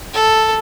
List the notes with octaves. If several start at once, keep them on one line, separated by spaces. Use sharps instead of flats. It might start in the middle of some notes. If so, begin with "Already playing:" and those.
A4